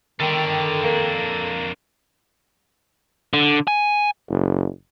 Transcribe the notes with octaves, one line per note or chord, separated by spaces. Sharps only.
D3 D#3 A4 G5
F2 A#3 D4
D3
G#5
F#1